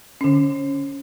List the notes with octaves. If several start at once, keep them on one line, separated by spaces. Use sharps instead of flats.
D3 C#4